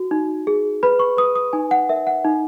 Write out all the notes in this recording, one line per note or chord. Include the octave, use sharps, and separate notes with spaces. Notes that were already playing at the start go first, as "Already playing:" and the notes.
Already playing: F#4
D#4
G#4
B4 B5
C#6
B4 D#6
D#6
D#4 G#5
F#5
A#4 E5
F#5
D#4